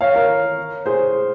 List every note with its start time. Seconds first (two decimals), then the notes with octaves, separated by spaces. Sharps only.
0.01 C#5 F5
0.15 A#4 C#5
0.86 G#4 C5